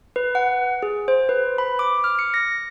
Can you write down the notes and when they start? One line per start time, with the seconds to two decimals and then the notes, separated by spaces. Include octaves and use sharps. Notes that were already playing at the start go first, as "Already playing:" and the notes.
0.16 B4
0.35 F#5
0.83 G#4
1.08 C5
1.29 B4
1.58 B5
1.79 D6
2.04 F6
2.19 C#7
2.34 A#6